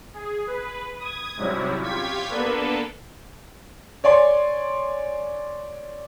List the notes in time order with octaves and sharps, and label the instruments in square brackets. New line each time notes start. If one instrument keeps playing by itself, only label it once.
[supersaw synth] G#4
B4
D#6 G#6
G#2 C3 F#3 G3 C#4 E4
F4 G4 C#6 G#6 B6
A#3 B3 D4 A4 B4
[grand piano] C#5 D5 G#5 C6